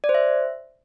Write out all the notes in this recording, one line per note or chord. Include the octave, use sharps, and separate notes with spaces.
D5
C5
E5